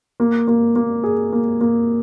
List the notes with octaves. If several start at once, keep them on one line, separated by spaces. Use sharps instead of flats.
A#3
A#3
A#3
G#4
A#3
A#3